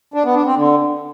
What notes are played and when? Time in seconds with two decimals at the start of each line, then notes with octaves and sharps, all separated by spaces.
0.14 D4
0.25 B3
0.35 D4
0.46 C4
0.57 D3